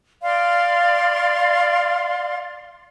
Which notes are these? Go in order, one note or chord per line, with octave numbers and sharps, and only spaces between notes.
D5 F5 C6